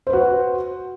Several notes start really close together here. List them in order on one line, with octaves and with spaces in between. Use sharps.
C5 B4 F#4